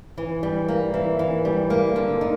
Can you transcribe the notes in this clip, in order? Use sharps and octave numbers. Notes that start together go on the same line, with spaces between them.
E3
G3
A#3
E3
E3
G3
A#3
D3
D#4